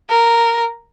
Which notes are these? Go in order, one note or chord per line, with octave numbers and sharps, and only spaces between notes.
A#4